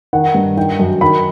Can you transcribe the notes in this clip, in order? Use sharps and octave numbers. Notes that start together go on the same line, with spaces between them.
D#3 F#5
G2
D#3 G5
F#2
D#3 B5